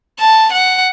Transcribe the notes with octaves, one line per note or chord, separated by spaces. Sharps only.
A5
F#5